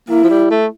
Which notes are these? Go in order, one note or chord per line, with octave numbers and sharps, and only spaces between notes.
A#3 E4
F3
G3
A3